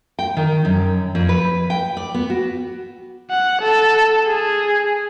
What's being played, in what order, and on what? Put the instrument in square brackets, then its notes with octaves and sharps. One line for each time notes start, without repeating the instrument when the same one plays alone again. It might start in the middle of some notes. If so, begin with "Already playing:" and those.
[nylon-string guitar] G5
D#3
F#2
F2
B4
G5
D5
B3
F#4
[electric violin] F#5
A4
G#4